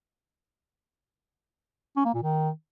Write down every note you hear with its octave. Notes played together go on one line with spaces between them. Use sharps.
C#4
A#3
A#2
D#3